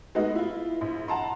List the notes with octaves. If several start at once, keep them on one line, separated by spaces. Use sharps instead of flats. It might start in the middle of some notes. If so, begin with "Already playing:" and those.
G#3 A3 B3 D#4 F#4 D#5
E4 F4
A#1
F#5 A5 A#5 C6